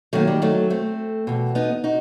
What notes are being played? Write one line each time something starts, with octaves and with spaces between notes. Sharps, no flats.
D#2 D#3 F#3 A3
G3
F#3 A3
A3 C4
E2 B2
B3 D#4
D#4 F#4